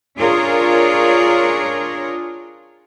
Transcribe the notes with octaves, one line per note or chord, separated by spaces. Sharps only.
D4 F4 G#4 A#4 C#5